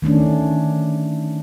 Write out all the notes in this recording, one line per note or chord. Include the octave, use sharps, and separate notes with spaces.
D#3 A3 C#4 D4